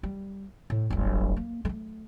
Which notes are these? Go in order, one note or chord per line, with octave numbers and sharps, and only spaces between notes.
G3
A2
D1 G1
A#3
G#3 A3